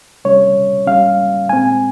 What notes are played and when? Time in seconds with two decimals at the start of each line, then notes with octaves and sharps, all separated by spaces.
0.24 C2 C3 G3 C#4 C#5
0.86 G#2 G3 C#4 F5
1.49 A#2 G#3 C4 G#5